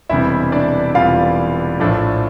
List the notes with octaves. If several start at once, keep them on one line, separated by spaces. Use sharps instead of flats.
E1 E2 C3 G3 E4 E5
D4 D5
E1 E2 C3 G3 F4 F5
A#1 A2 F3 A3 D4